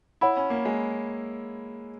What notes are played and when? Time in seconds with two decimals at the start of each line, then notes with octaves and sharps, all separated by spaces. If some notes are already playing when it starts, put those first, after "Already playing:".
0.21 E4 C#5 F#5 B5
0.37 C#4
0.50 A#3
0.65 G#3